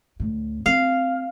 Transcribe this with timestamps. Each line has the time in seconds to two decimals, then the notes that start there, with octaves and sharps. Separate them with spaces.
0.20 D2 A2
0.66 C4 F5